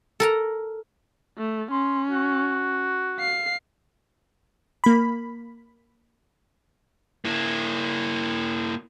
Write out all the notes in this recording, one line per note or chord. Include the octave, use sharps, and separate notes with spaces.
A4 A#4 A#5
A3
C#4 C6
F#4
F5 C7
A#3 B5
A#3 E4